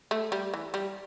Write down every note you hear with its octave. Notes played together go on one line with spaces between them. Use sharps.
A3
G3
E3
G3